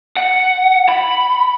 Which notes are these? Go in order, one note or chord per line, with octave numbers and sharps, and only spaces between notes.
F#5
B5